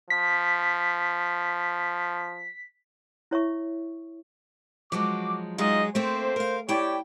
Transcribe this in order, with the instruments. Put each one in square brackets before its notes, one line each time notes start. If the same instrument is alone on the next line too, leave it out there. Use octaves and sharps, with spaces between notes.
[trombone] F3 [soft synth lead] B6
[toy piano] E4 C#5 E5 C#6
[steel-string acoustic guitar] F3 F#3 G#3 [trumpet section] F#4 D6
[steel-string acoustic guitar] F#3 G#3 G#4 [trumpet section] D#4 F4 D#5
[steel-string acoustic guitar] A3 A#3 C4 [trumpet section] C5
[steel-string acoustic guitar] A#4 F5
[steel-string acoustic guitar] E4 G5 [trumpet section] G4 C#5 D5